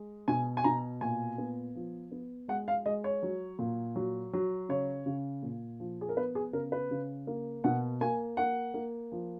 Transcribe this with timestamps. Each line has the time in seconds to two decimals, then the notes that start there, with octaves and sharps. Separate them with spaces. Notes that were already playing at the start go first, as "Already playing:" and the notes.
Already playing: G#3
0.28 B2 G#5
0.57 G#5
0.64 B2 A#5
1.01 A#2 G#5
1.38 B3
1.75 F3
2.12 B3
2.48 G#3 F#5
2.68 F5
2.86 G#3 D#5
3.04 C#5
3.23 F#3
3.59 A#2
3.96 F#3
4.33 F#3
4.69 C#3 C#5
5.06 C#3
5.43 A#2
5.80 F3
6.01 G#4
6.09 A#4
6.17 B3 B4
6.35 G#4
6.53 C#3 A#4
6.72 B4
6.91 C#3
7.27 A#3
7.64 B2 F#5
8.01 A#3 G#5
8.37 A#3 F#5
8.74 A#3
9.12 F3